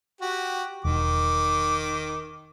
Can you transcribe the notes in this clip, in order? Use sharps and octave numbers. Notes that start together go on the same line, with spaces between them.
F#4 G4
E1 D#3 D6